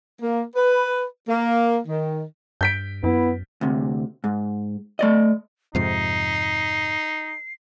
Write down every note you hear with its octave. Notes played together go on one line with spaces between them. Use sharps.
A#3
B4
A#3
D#3
G2 G6 B6 D7
F#2 B3 E4
D2 C3
G#2
A3 D5 D#5
F2 G#2 C3 D#4 C7